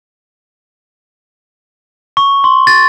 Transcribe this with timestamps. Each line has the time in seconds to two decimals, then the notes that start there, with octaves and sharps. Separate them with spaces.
2.17 C#6
2.44 C6
2.67 A6